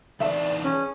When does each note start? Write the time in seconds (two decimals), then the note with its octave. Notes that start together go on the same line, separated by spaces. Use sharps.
0.20 E3 D#4 D5 E5 A5
0.64 C#4 G#4